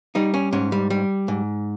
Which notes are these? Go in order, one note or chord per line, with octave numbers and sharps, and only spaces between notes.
G3 D#4
C#4
G#2 C#4
G3
G3
G#2